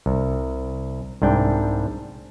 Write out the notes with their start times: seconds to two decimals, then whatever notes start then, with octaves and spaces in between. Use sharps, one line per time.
0.06 C2
1.22 C2 G#2 D4 G5